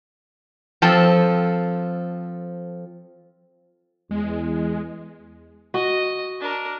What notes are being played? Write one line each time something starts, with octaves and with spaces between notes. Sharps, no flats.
F3 C4 A4
E2 G#3
F#4 D#5
D4 A#4